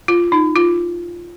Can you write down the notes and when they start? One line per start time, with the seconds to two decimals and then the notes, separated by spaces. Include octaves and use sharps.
0.08 F4
0.32 D#4
0.56 F4